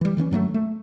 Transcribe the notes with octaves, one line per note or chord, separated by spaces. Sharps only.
E3 G3
D#3 E3 A#3 C#4
G2 F#3 G#3 A3
A3